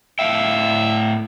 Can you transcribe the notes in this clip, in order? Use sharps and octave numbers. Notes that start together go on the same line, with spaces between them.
A2 E5 F5 G5